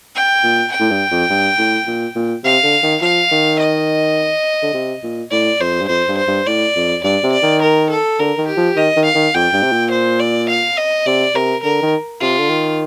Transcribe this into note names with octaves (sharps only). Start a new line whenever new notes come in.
G5
A#2
G5
A2
G2
F2
G2
A2
A#2
A#2
C3 F5
D3
D#3
F3 F5
D#3
D#5
D3
C3
A#2
A2 D5
F2 C5
G2
F2 C5
G2
C5
G2
A2 D5
F2
G2 D5
C3
D5
D#3
A#4
A4
D3 A#4
D#3
G4
F3
D#3 D#5
D#3
F5
D#3
F2 G5
G2
C3
A#2
C5
D5
F5
D#5
C3 D5
C3 A#4
D3 A#4
D#3
C3 F4
D3
D#3